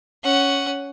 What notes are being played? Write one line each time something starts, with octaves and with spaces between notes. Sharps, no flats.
C#4 F#5